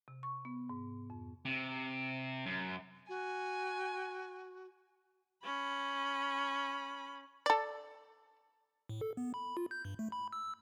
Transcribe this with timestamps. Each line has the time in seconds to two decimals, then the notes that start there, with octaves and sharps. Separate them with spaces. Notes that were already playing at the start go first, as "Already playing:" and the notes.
0.08 C3
0.23 C#6
0.45 B3
0.69 G#2
1.10 F2
1.45 C3
2.46 F#2
3.09 F#4 G#5
5.44 C#4 B5
7.46 A4 D5
8.89 A2
9.01 A4
9.17 B3
9.34 B5
9.57 F4
9.71 G6
9.85 G2
9.99 A3
10.12 B5
10.33 E6